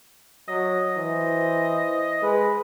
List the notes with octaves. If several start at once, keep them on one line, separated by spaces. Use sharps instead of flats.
F#3 D#5
E3 C5
G#3 B4